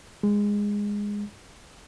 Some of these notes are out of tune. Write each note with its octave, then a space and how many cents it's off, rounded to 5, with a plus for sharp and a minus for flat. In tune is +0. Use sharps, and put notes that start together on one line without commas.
G#3 -15